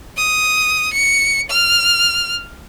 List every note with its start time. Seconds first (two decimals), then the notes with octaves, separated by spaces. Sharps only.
0.17 D#6
0.93 C#7
1.50 F6